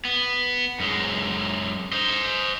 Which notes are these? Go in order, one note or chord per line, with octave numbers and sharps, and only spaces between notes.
B3
F#2 G#3
C5 D#5